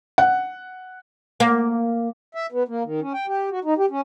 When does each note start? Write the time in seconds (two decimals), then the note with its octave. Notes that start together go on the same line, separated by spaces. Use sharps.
0.18 F#5
1.40 A#3
2.35 E5
2.52 B3
2.68 A#3
2.84 D#3
3.01 C#4
3.14 G5
3.27 G4
3.50 F#4
3.65 D#4
3.78 G4
3.90 C#4